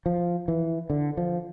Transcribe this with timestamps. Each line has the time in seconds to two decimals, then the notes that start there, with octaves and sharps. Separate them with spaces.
0.06 F3
0.48 E3
0.90 D3
1.17 F3